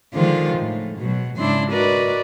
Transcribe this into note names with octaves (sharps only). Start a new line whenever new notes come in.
D3 D#3 F3 G#3 F4 C5
A2
B2 F#3
G#2 C#3 D4 E4 C6
F#4 A#4 B4 D5 D#5